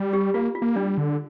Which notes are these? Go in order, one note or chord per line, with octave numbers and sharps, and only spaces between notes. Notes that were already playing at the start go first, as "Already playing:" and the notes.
Already playing: G3
G4
A#3 F4
F4
A#3
G3 D4
D3